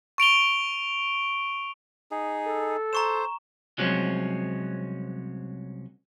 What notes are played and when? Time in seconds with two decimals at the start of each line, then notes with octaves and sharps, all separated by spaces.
0.18 C#6 D7 F7 G7
2.11 D#4 G#4
2.46 A4
2.93 C5 A#5 C#6 E7
3.78 C2 F3 F#3 G#3 C4 C#4